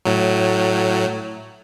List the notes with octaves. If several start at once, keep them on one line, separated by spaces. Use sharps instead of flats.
A2 F#3